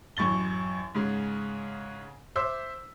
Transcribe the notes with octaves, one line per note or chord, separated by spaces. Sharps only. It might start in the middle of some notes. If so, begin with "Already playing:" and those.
A1 F#2 C#6 A6 G7
G#2 C#3 G#4
C5 E5 C6 D6 E6